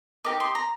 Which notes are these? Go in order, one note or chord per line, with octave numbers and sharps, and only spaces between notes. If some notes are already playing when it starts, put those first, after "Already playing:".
D#4 G4 A#4 D#5 D6
C6
A#5